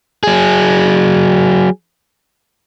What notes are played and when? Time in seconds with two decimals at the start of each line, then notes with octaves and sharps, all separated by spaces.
0.23 F#3 G#4